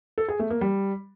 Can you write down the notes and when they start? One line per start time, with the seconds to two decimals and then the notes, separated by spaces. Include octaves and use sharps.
0.18 A4
0.28 G#4
0.39 A3
0.50 A#3
0.61 G3